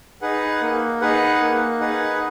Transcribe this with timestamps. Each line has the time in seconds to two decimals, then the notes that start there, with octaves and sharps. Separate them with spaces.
0.22 D#4 G#4 B4 F#5
0.62 A#3
1.01 D#4 G#4 B4 F#5
1.41 A#3
1.80 D#4 G#4 B4 F#5